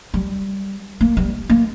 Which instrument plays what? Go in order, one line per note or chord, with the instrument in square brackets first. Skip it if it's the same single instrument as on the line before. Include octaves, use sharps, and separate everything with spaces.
[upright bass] G3
A#3
G3
A#3